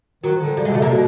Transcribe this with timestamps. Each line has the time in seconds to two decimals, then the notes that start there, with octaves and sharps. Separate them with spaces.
0.24 D#3 F#3
0.41 D3
0.57 C#3 G3
0.65 G#3
0.68 C3
0.74 B2 A3
0.79 C3 A#3
0.90 B2